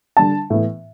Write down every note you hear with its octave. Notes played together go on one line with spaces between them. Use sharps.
D3 G3 D4 A5
A2 E3 B3